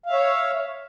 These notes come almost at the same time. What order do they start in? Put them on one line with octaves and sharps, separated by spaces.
F5 E5 C#5